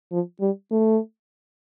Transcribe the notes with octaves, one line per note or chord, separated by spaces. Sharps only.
F3
G3
A3